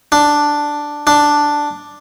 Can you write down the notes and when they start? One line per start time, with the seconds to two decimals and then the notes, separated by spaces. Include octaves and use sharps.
0.12 D4
1.07 D4